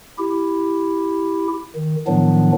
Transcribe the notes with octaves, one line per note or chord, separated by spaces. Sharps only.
E4 G4
D#3
A2 D#3 F3 F#3 B3 D4